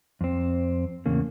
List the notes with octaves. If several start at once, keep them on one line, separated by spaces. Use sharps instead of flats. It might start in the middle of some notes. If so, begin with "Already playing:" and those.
F2 C4
E2 A2 C#3 A#3